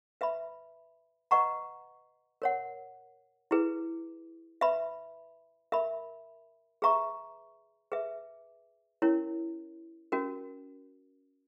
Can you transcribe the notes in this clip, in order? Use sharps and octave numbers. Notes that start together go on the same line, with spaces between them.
B4 E5 B5
B4 D#5 F#5 A#5 C#6
A#4 C#5 F#5
E4 G#4 B4
B4 E5 B5
A#4 E5 B5
G#4 B4 E5 A#5 C#6
G#4 B4 E5
C#4 E4 A#4 C#5
C#4 F#4 A#4